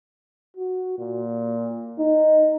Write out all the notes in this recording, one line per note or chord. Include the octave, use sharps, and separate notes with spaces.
F#4
A#2
D#4